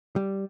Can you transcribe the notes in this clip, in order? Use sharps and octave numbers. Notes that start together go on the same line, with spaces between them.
G3